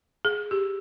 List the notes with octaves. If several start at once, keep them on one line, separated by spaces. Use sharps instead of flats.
G#4
G4